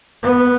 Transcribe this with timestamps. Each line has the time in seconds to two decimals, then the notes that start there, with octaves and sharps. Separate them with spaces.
0.23 B3